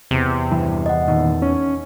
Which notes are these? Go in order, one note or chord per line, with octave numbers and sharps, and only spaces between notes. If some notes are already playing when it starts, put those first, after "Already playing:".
E2 C3
G2 E3
D#5 F#5
A#2 D#3 D#4
C#4